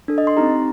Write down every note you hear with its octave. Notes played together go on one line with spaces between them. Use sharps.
D4 A4
D#5
C6
C4 D#4 G4 A#5